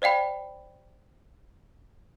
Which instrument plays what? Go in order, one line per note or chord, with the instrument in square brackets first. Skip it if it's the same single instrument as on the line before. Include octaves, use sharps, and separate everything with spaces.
[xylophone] C5 D5 F5 G5 B5